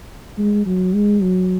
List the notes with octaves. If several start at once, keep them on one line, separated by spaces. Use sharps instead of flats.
G#3
F#3
G#3
F#3